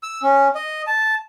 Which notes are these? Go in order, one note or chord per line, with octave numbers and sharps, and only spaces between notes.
E6
C#4
D#5
A5